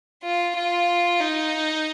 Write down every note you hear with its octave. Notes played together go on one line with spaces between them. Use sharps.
F4
F4
D#4